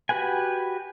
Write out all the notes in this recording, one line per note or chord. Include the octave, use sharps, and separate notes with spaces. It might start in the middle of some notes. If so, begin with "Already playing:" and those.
F#4 G4 B4 F#5 G#5